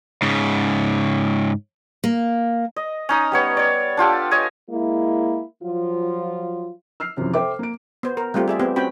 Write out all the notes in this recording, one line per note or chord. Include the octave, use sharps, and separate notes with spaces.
G#2 C#3
A#3
D#5
C#4 D#4 D#6
G3 B3 C#5
C#5 D5
D4 F4 G4 A4
C#5 D#5 G#5
G#3 A#3 E4
F3 F#3 F4
E6 F6 C7
F#2 C3 E3 F3
A4 C5 E5 G5 D6
A#3 D7
B3 C5
A#4
G3 A3 C4 F4 G4
G#4 D5 E5
B3 C4 G4
C4 C#4 F#4 G5 B5